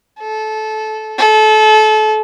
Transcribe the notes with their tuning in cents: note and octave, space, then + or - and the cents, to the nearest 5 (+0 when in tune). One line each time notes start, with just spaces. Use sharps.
A4 -20
A4 -30